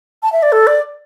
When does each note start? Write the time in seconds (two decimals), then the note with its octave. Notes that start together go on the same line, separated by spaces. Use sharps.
0.23 A5
0.32 E5
0.43 D5
0.52 A4
0.67 D5